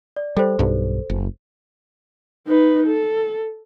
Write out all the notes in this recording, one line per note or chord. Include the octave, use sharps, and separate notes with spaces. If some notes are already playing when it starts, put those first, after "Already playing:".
D5
G3 A4 C5
B1 G2
F#1
D#4 B4
A4